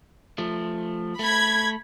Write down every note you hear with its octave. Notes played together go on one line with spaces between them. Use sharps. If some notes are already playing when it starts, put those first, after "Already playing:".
F3 A3
A3 B5 G#6